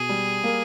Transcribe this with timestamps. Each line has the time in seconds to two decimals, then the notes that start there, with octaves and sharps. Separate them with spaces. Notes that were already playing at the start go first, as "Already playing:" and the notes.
Already playing: B2 G#4
0.09 G3
0.44 A#3